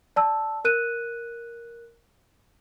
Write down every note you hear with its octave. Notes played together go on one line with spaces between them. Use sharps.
D5 A5 E6
A#4 F#6 D#7